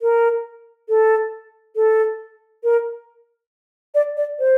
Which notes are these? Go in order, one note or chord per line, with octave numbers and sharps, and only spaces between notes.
A#4
A4
A4
A#4
D5
D5
C5